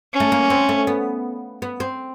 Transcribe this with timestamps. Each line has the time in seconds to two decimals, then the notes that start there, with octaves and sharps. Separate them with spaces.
0.13 C#4
0.20 A3
0.32 A#3
0.50 C4
0.69 A3
0.87 B3
1.62 B3
1.80 C4